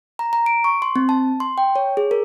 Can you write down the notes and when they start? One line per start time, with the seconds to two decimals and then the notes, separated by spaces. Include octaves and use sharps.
0.19 A#5
0.33 A#5
0.46 D7
0.64 C#6
0.82 C6
0.96 C4
1.09 A5
1.40 C6
1.58 G5
1.76 C#5
1.97 G#4
2.11 A#4